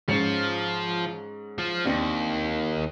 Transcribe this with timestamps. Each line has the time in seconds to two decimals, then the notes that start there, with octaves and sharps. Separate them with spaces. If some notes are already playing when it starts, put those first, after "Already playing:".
0.08 G#2 F3 C#4 C#7
1.58 F3
1.85 D#2 C4 D4